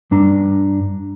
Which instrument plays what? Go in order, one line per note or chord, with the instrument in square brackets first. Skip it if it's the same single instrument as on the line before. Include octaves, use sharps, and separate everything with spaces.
[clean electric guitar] G2 D4 A#5